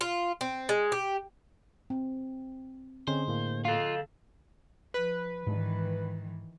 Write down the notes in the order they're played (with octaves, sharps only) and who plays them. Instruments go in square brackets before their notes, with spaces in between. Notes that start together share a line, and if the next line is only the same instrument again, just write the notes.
[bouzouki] F4
C4
G#3
G4
[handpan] C4
[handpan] D3 G#4 D#5 [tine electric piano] C4 C#4 [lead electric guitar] C5
[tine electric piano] A2 A#3
[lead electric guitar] F4 [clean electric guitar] A4 F5
[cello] F3 [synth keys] B4
[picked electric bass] G#2 G#3 D4 [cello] D#3 E3